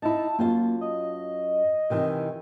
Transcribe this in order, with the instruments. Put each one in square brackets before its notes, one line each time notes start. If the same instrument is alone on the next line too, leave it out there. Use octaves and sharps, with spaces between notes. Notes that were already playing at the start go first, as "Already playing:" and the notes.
[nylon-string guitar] D#4 E4 [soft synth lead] A5
[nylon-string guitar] F#2 F4 A5 [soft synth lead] A#3
[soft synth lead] D#5
[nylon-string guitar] C3 D#3 E3